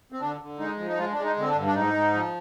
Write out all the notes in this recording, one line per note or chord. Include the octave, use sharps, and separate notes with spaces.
C4
D3 D4
D3
G#3 D#4
F3
D#4
G#3 F4
G#3 D4
D#4
D3 C4
D4
G2
D4
G#2 D#4
G#2
F3